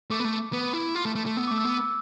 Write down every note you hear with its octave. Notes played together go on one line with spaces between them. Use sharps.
A3 D6
B3
A3
B3
E4
F4
A3
A3
A3
B3 E6
D6
A3
E6
B3 D6
E6